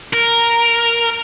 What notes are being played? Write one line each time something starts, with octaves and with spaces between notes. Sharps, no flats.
A#4